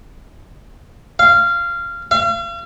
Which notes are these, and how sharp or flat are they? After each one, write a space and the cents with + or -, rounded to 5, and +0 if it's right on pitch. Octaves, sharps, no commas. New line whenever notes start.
F5 -15
F5 -40